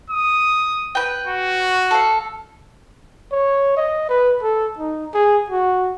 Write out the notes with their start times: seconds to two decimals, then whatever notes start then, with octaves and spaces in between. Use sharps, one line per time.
0.10 D#6
0.95 B4 G5
1.26 F#4
1.91 A4 F5
3.32 C#5
3.77 D#5
4.09 B4
4.42 A4
4.78 D#4
5.14 G#4
5.50 F#4